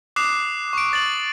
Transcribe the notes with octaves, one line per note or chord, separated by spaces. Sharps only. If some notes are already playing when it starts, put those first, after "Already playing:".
D6 D#6 F#6 C7 E7
C#6 D7
A6 F#7